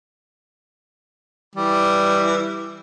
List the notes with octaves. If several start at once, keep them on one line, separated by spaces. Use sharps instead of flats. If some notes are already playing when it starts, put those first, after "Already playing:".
E3 G3